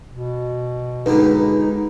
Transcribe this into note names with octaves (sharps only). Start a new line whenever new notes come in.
B2
C#2 G#2 D3 D#4 B4